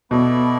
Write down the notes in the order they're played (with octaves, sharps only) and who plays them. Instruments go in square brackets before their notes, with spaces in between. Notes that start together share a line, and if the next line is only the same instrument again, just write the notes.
[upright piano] B2 [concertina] B3 E4 A4 D5